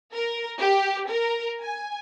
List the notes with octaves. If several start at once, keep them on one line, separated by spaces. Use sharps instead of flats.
A#4
G4
A#4
G#5